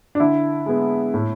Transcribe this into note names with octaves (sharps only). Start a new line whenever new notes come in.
D4
D3 E4
G#3 B3
A2